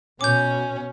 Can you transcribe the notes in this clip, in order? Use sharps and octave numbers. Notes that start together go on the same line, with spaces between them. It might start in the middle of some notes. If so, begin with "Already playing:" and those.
B2 C#4 D6 G6